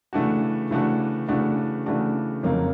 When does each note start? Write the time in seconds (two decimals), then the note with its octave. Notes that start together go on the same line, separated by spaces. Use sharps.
0.13 C#3 E3 A3 D4 F#4
0.71 C#3 E3 A3 D4 F#4
1.28 C#3 E3 A3 D4 F#4
1.86 C#3 E3 A3 D4 F#4
2.43 F2 C#3 F#3 A#3 D#4